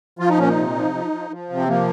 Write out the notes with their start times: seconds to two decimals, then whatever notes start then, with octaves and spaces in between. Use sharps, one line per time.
0.19 F3 F4
0.29 D#4
0.37 A#2 C#4
0.49 D#4
0.56 C3
0.75 F3
0.94 F3
1.12 F3
1.30 F3
1.49 C3
1.56 C4
1.68 F3 A#3